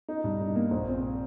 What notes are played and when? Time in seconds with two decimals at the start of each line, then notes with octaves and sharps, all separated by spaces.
0.08 D#4
0.24 G2
0.40 D#4
0.55 A#3
0.71 A#1
0.87 C4